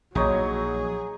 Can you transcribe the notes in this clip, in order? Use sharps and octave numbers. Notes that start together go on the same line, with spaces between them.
A#1 F#3 D#4 G#4 C#5